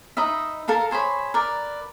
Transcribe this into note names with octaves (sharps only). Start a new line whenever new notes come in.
D#4 B4 D#5 E5
A4 A#4 F5 A#5
G#4 C5 C#5 B5
A#4 B4 D5